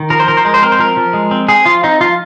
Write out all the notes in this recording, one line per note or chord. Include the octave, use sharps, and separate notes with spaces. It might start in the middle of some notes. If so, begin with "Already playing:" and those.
Already playing: D#3
F3 A#4
C5
F3 A#4
C5
G#3 A#4
C5
C4 A#4
C5
F3 A#4
F3
G#3
C4
C4 G#4
F3 F4
C4 D#4
F3 F4